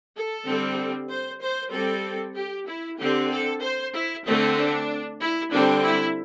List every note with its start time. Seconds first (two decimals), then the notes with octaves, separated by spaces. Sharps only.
0.14 A4
0.46 D3 G3 C4
1.09 C5
1.40 C5
1.72 G3 C4 A4
2.35 G4
2.67 E4
2.98 D3 C4 G4
3.30 A4
3.61 C5
3.94 E4
4.25 D3 A3 C4
4.56 D4
5.20 E4
5.51 D3 G3 C4 D4
5.83 E4